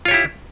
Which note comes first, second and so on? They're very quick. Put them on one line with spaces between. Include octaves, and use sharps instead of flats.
F4 C#5 G4 E4